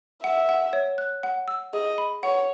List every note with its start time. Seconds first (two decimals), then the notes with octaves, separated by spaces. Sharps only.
0.23 E5 F#5
0.49 F#5
0.73 C#5
0.98 F#6
1.23 F#5
1.48 E6
1.73 G#4 D#5
1.98 B5
2.23 C#5 F#5